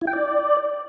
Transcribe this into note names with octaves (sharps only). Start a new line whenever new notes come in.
E4
G5
D5